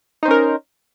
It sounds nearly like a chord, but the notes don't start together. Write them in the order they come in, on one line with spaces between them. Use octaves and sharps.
D#4 C5 C#4 A#4